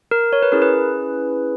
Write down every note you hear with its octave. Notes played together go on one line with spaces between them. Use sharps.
A#4
C#5
B4
C#4 E4 G#4 A#4
B4